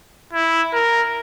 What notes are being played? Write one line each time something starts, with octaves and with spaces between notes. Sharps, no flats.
E4
A#4